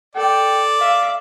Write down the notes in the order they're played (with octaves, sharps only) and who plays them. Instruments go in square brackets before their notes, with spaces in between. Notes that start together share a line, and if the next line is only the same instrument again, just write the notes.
[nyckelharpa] A4 [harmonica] D5 [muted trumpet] G5
[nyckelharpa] E5 [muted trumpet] F5